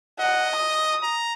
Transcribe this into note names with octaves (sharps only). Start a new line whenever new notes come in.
D#5 F#5
D#6
A#5